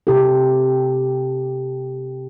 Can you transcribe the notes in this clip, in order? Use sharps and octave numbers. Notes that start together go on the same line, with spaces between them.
C3 G4 A4